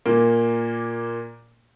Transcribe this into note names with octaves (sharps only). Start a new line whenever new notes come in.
A#2 A#3